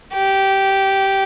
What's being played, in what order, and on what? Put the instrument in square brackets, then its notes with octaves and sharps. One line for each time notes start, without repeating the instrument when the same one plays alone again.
[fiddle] G4